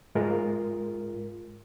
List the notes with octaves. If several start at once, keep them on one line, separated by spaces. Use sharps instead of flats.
G#2 G#3 F4 A#4